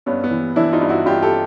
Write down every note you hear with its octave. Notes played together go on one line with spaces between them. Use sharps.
G2 B3 C#4
B3
E3
E3 D4 E4
D#4 F4
G2
E4 F#4
G2 F4 G4
G4 A4